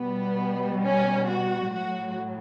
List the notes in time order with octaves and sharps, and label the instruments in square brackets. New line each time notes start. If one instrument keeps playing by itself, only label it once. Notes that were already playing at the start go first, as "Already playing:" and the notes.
Already playing: [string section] B2 G3 B3
C#4
F#4
A2 F#3 F#4